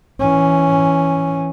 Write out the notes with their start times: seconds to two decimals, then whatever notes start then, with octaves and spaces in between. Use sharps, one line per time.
0.20 E3 C#4